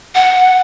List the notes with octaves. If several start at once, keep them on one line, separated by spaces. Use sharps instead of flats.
F#5